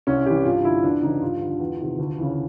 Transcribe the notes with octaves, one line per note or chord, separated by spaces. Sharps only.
C2 C#4
C3 E3 G4
G2 F4
D3 E4
E2 D4
C#3 E3 D#4
G2 F4
D3
E2
C3 D#3
D2
C#3 E3